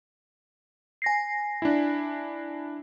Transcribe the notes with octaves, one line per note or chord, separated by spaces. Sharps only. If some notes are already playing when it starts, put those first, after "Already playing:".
G#5 A#6 C7
D4 E4